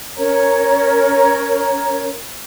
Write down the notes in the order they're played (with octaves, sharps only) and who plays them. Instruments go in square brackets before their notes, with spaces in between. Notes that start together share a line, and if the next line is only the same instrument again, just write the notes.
[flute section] C#4 A#4 C#5 A#5